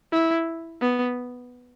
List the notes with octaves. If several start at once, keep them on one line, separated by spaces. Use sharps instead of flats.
E4
B3